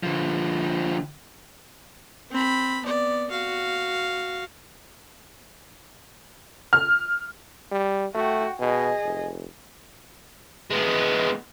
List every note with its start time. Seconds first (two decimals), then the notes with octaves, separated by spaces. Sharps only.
0.03 D3 F3
2.31 C4 B5
2.84 B3 D5
3.31 F#4 F5
6.73 F6
7.71 G3
8.15 A3 F#4 G5
8.60 B2 G#4 D#5
9.04 F1
10.71 G#3 B3